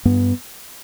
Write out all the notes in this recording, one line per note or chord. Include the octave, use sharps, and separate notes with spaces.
G2 B3